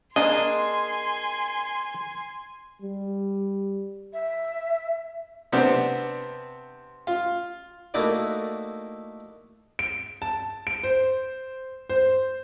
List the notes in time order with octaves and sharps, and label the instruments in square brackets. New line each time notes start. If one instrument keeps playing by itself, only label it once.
[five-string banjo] A#3 D4 G#4 [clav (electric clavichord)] D#5 [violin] G#5 C6
[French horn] G3
[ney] E5
[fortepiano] C3 B3 C4 D4
F4
[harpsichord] A3 A#3 D#4 E4 F#4 D5
[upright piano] D7
A5
D7
C5
C5